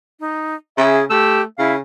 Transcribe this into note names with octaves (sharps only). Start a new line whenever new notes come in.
D#4
C#3 G#4 E5
A3 G4 E6
C#3 E4 F5